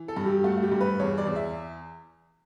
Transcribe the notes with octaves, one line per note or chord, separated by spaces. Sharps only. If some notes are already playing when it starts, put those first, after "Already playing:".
Already playing: E3
A4
G2
G4
A3 F#4
F#4
G4
G2
B4
E2 C#5
D5
E2
E5